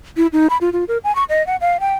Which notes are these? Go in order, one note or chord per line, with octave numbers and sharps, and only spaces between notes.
E4
D#4
B5
F4
F4
A#4
G#5
C#6
D#5
F#5
F5
G5